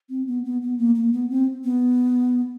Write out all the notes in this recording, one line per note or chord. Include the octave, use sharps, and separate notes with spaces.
C4
B3
B3
B3
A#3
A#3
B3
C4
B3